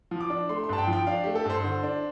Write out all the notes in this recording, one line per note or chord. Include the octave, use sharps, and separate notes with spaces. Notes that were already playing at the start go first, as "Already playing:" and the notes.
F3
D6
D4
A3 C6
C6
G2 A5
G5
F3
G5
D4 F5
A3 G4
A4
G2 C5
D3
D4